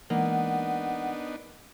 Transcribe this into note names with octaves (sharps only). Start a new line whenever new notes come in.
E3 G#3 A#3 B3 D4 D#4 F#5